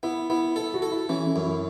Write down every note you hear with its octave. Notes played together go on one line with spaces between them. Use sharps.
B3 E4
B3 E4
E4 A4
F#4
A4
E4
E3 C#4
C#4
F#2
E4